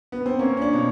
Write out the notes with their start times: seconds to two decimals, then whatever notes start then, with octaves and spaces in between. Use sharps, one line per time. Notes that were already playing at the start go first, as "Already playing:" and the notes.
0.12 B3
0.26 C4
0.39 A#3 C#4
0.57 C#4
0.62 D4
0.73 B2